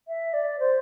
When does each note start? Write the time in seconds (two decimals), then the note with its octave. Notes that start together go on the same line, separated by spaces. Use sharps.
0.07 E5
0.33 D5
0.59 C5